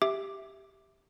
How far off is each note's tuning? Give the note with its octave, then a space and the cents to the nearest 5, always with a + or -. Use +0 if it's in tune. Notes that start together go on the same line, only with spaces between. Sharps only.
G4 +0 E5 -5 D6 +5